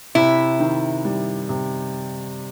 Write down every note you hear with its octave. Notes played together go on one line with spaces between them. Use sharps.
C3 E4
D#3
G3
C3